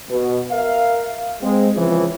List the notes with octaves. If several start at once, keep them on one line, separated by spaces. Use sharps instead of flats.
B2
A#4 E5 F5
G#3 C4
C#2 E3 F3